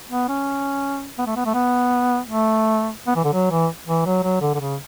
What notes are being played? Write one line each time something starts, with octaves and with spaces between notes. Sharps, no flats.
B3
C#4
B3
A3
B3
A3
B3
A3
B3
E3
D3
F#3
E3
E3
F#3
F#3
D3
D3
C#3